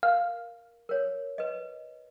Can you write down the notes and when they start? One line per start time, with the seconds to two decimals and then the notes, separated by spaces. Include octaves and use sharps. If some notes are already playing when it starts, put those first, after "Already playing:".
0.03 A#4 F5
0.89 A#4 C#5
1.38 B4 D#5